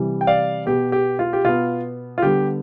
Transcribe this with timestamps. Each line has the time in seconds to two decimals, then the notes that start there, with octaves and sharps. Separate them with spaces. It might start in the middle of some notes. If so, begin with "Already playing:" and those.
Already playing: C3 E3 G3
0.21 G5
0.27 D5 F5
0.66 B2 B3 G4
0.92 G4
1.19 F4
1.33 G4
1.44 B2 B3 F4
2.18 F4
2.22 D3 G3 B3 G4